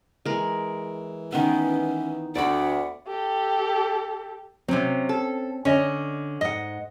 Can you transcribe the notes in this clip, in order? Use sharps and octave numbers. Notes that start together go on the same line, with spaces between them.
E3 G#3 A#4
D#3 B3 C#4
D2 D5 F#5 B5
G4 A4
C3 F#3 C4 C#4
A4
D3 C#4 D#5
G#2 D#5 F#5